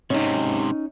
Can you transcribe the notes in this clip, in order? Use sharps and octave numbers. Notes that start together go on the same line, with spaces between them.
G#2 C3 C#4 D#4